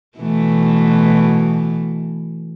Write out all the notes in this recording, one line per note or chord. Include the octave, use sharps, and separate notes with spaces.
B2 E3 A3